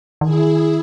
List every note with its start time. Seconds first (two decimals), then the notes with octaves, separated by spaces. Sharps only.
0.21 D#3 E4 G#4